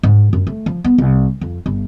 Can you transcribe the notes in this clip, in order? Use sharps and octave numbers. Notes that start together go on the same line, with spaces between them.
G#2
F#2
A3
F3
B3
C2
F2
G1